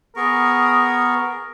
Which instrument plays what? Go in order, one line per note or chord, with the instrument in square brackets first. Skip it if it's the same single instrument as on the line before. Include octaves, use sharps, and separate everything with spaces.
[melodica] B3 G#4 C#6 [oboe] A#4